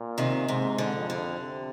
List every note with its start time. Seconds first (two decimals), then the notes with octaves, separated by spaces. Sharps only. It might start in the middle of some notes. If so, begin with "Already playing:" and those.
Already playing: A#2
0.18 C3 D#3
0.48 G#2 C3
0.78 D3
0.95 F2
1.10 D3
1.40 C3